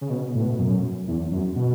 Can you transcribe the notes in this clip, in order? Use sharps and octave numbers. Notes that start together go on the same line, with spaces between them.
C#3
B2
A2
B2
F#2
E2
F#2
B2